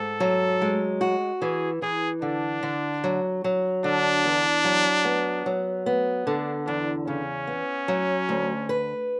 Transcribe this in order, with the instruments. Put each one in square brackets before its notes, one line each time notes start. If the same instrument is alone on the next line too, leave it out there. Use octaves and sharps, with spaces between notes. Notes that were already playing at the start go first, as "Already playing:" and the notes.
Already playing: [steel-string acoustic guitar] G#2 [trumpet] A4
[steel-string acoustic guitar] F#3
G#3
F#4
[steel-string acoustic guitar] E3 [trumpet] G#4
[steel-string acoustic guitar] E3 [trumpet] G#4
[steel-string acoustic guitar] D3 [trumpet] D4
[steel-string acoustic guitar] D3
F#3
F#3
[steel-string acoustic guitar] D3 [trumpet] D4
[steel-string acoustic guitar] E2
F#3
B3
F#3
B3
[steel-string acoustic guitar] D3 [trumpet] D4
[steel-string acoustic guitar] E2 [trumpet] D4
[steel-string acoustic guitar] C#3 [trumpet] C#4
[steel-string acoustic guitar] B3
F#3
D2
B4